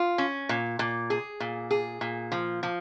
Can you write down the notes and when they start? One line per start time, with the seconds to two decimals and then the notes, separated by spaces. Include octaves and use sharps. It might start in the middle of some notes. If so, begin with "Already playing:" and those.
Already playing: F4
0.18 C#4
0.49 A#2
0.79 A#2
1.10 G#4
1.40 A#2
1.71 G#4
2.01 A#2
2.32 F3
2.63 F3